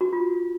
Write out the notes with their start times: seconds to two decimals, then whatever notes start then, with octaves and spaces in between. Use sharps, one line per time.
0.01 F#4
0.13 F4